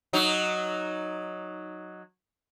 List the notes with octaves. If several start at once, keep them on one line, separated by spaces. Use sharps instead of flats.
F#3 D#4